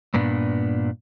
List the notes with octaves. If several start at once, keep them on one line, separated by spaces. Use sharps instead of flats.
G2 A#2 B3 D4